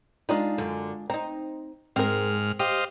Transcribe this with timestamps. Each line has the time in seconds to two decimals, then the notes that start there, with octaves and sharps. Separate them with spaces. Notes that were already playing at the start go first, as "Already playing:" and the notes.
0.29 G#3 D4 D#4 F4
0.58 F#2 D3
1.10 C4 D#4 A#5
1.96 G#2 G#3 C4 A#4 F6
2.59 G4 C5 D#5 F5